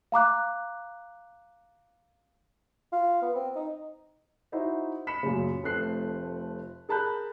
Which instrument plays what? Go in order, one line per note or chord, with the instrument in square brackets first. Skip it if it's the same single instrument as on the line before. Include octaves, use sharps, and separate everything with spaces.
[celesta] F5 A#5 D6 F#6
[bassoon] F4
B3
C4
D#4
[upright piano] D#4 E4 F#4 C5 D#5 E5
B5 B6 C#7 E7
F#2 A#2 C#3
F1 F3 A3 C4 F#6 C7
G#4 A#4 A5 B5 F#6 G6